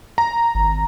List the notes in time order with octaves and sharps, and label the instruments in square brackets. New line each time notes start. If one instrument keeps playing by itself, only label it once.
[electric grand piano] A#5
[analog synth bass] G#1